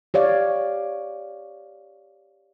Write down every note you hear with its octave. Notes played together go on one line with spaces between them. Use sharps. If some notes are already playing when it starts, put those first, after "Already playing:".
G4 C#5 D5 F5